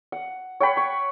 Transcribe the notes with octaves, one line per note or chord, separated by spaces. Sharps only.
F#5
C#5 F#5 G5 B5
C#6